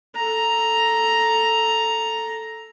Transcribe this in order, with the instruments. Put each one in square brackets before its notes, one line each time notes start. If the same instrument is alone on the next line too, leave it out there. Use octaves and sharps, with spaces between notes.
[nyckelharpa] A4 A#5